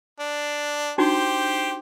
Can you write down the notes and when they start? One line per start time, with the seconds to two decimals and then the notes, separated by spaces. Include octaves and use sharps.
0.19 D4
0.98 D4 D#4 F#4 G4 C5